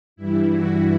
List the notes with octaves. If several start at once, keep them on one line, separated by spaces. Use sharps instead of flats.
G2 E3 G3 E4
F#4